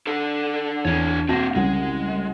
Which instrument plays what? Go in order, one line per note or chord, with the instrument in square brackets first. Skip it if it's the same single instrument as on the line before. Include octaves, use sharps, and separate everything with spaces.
[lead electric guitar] D3 A4
[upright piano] E2 [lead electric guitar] D4 C#5
[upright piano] B2 A5 A#6 [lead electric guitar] A#3 C4
[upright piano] C2 C#3 F#5 [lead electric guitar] G#3